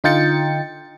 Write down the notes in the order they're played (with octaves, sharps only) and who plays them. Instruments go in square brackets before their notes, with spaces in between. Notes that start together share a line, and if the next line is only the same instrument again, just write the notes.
[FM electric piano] D3 D#4 F4 G5 A6 C#7